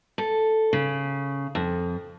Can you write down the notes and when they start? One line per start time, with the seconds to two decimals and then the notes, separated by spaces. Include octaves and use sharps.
0.18 A4
0.73 C#3
1.55 F2